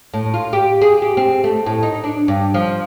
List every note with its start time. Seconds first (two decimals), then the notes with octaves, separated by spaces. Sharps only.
0.14 A2
0.34 F4
0.53 G4
0.82 G#4
1.02 G4
1.17 C4
1.44 A3
1.66 A2
1.83 D#4
2.04 D4
2.28 G2
2.54 F3